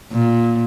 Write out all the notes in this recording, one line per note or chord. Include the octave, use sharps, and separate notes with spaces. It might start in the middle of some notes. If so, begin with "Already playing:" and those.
A#2